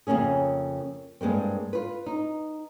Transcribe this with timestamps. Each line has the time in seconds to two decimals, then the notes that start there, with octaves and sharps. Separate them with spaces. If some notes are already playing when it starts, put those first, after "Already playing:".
0.07 F2 C#3 A#3 C#4 G#4
1.21 G2 G#3 A#3 C4
1.73 F4 B4
2.06 D#4